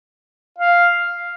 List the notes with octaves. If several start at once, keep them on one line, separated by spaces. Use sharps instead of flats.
F5